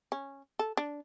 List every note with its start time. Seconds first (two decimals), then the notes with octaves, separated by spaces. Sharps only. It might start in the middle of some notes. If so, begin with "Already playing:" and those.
0.12 C#4
0.59 A4
0.77 D4